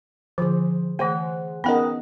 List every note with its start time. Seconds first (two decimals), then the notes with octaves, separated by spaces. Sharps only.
0.38 D3 F3 G#4 C5
0.99 E3 A3 G#4 C5 F#5
1.64 B3 C#4 D#4 G#4 A#4 D#5 F#5 G5